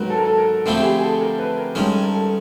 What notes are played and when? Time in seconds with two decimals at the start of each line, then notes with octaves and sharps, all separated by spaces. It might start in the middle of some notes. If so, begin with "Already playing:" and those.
Already playing: G#2 D#3 F#3 A#4 B4
0.10 A4
0.17 A#4
0.25 A4
0.38 A#4
0.66 D3 F3 A3 C4 E4 A4
0.79 G4
0.84 G#4
0.98 G#4
1.02 A4
1.21 A#4
1.39 B4
1.58 A#4
1.75 G2 D#3 G#3 C#4 A4
2.03 A#4
2.12 A4
2.20 A#4